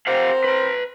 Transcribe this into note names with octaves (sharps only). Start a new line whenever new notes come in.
C4 G4 A#4 C5 F5 F#5
B4 A#5